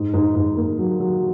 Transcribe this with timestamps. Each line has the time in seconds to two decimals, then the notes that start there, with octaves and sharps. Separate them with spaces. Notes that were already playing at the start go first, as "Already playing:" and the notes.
Already playing: G#2
0.14 G#2
0.35 G#2
0.57 A#3
0.79 F#3
1.00 F#3